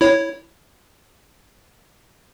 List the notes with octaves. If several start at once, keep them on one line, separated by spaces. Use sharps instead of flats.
E4 C#5